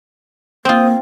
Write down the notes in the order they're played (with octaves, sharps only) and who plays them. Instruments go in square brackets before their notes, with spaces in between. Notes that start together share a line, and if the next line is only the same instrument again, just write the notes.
[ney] A#3 [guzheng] C4 F4 [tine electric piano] C5 D#6